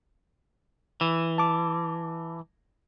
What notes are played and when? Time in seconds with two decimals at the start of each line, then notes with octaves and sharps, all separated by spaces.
1.01 E3
1.38 A5 D6